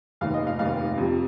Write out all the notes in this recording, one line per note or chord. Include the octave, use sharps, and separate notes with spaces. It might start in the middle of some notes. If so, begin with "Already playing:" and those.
F1 D#2 D#3 F5
D#5
F5
F1 D#2 D#3 F5
F2 C3 G3